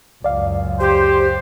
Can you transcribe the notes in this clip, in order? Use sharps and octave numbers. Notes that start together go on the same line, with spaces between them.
C#2 F#2 D5 F5
G4 C5